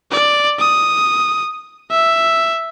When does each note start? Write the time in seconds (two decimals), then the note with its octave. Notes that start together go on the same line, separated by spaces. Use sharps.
0.11 D5
0.59 D#6
1.91 E5